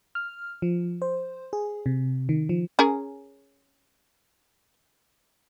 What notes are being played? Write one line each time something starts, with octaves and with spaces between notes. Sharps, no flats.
F6
F3
C5
G#4
C3
D#3
F3
C#4 G#4 A#4